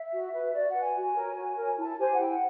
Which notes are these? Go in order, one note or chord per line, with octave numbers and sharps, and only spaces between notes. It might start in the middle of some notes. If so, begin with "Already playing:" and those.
Already playing: E5
F#4
B4
F#4 D5
F#5
B4
G#5
F#4
A#4 C#5
F#4
A#4 C#5
E4 A5
G4 C5 G#5
F#5
E4 G5
F#5